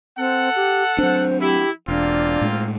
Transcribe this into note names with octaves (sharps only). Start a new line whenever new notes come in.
C4 A4 F#5
G4
F#3 C4 D4 C5
E4 G4
E1 A#3 C4 D4 F4
A2 G#3